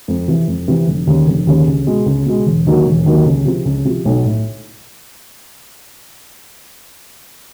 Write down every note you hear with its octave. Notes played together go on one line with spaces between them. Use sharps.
F2
C3 E3
F2
C3 E3
F1
D#2 C#3
F1
D#2 C#3
C#2
B2 G#3
C#2
B2 G#3
E1
D#2 D#3 F#3 A#3
E1
D#2 D#3 F#3 A#3
C#2
C3 F3
C#2
C3 F3
B1
A2